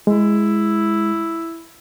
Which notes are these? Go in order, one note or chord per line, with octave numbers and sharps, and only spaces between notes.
G#3 E4